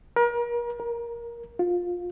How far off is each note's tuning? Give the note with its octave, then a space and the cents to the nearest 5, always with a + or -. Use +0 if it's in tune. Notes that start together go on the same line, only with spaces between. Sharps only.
A#4 +35
A#4 +10
F4 +15